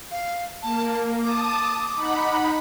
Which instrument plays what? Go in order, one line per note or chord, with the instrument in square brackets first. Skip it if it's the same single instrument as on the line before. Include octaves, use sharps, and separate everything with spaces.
[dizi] F5
[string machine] A#3 [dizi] A5
[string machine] A5 D#6 [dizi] D6
[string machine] D#4 F#5 B5